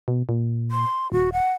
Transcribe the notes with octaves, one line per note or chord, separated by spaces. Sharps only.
B2
A#2
C6
D#1 F#4
F#5